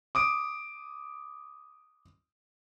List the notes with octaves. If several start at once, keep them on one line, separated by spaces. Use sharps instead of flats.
D6 D#6 D7